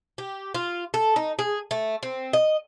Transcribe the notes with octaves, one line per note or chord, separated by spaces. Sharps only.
G4
F4
A4
D#4
G#4
A3
C4
D#5